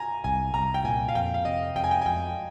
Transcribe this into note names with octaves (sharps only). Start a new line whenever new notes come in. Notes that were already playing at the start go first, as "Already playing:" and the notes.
Already playing: G#5 A#5
C2 G#5
C2 A#5
G5
A#2 G#5
F5
F2 G5
F5
C3 D#5
F2 G5
G#5
G5
G#5
F2 G5